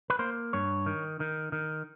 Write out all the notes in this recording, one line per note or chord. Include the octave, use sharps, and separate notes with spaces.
B4
A#3 C5
G2 C#5
D#3
D#3
D#3